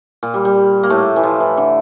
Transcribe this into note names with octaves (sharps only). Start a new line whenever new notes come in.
A#2
G3
G3
A#3
A2 A3
E3
F3
E3
D3